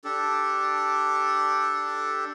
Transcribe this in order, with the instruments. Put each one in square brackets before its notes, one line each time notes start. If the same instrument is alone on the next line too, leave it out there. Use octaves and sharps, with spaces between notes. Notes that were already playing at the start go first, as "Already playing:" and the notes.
[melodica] D4 G4 A4